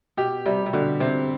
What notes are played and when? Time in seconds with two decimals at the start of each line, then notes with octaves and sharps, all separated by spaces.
0.17 B2 G4
0.46 C3 G3
0.66 C3
0.73 B2 D3
1.00 C3 C4